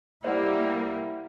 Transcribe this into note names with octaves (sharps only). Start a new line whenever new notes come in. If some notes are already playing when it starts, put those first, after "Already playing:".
G3 A#3 E4 C5 D5 E5 F#5